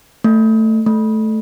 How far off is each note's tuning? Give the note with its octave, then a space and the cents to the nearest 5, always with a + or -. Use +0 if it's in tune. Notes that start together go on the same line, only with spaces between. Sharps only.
A3 +10
A3 -10